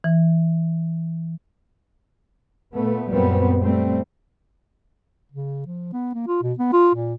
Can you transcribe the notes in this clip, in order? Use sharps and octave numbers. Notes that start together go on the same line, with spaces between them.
E3
A#2 A3 B3
F#2 A#2 G3 B3 C4
G3 A3 C4
C#3
F3
B3
A#3
F4
B2
B3
F4
A#2